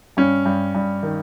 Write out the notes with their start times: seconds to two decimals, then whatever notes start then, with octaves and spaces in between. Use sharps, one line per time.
0.17 G2 C#4
0.45 G2
0.75 G2
1.03 D#3